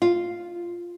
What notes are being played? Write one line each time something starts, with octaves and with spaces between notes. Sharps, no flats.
F4